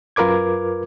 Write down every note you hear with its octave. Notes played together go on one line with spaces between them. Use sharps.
F#2 F4 A#4 B4 D6 G#6